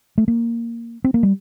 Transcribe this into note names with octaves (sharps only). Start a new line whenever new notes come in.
A3
A#3
C4
A#3
G3